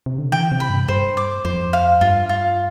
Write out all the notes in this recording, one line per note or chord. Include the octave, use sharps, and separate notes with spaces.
C3
D3
E3 G5
C3
B5
G2
G2 C5
D6
F2 C5
F5
G2 F4
F4